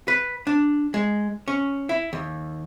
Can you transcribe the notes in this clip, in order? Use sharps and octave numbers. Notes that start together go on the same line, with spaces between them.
B4
D4
G#3
C#4
E4
D#2